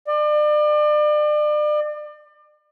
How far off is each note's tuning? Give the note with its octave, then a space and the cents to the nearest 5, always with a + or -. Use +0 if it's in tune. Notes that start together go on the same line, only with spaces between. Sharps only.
D5 +35